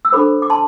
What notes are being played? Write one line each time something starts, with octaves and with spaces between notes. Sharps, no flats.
E6
D4 A4 C5 B5 D6
D6
A5 C6